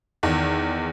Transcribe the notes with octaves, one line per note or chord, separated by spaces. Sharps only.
E2 D#3